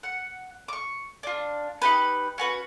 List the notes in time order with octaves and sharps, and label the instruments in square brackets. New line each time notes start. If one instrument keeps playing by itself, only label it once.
[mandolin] F#5
C#6 D6
D4 F4
D#4 G4 B4
C#4 F#4 B4